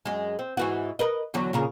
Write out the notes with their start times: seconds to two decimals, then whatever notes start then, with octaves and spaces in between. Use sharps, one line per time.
0.05 F#2 G#3
0.39 C4
0.57 G#2 E3 F#4
0.99 A#4 B4 D#5
1.34 E2 D3 F#3
1.53 A#2 C#3 A#4